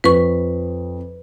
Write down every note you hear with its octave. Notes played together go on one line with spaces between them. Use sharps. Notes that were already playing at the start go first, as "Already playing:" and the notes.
F2 B4 C#6